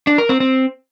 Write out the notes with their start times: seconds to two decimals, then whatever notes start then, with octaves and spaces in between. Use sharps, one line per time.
0.07 D4
0.18 A#4
0.29 C4
0.40 C4